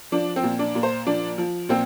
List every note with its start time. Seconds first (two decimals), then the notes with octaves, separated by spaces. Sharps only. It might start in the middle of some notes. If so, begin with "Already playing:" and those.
0.12 F3 D4
0.36 C4
0.43 A#2
0.59 D4
0.75 A#2
0.83 C5
1.07 F3 D4
1.38 F3
1.69 A#2 C4